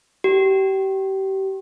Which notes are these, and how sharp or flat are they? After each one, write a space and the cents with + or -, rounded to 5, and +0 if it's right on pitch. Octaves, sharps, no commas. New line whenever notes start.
G4 -30